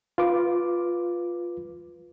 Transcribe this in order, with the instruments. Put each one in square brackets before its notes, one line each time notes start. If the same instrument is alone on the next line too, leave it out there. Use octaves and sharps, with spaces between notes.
[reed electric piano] F4 B4 D6